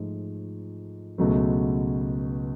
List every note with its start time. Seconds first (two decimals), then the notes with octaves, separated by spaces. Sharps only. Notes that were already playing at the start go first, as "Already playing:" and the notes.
Already playing: G#2 F3 A3
1.18 C#2 B2 F#3 A3